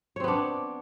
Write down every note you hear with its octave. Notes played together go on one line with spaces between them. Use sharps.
B3 C4 D4 C#5